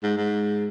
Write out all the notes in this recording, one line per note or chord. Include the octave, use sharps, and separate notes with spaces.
G#2
G#2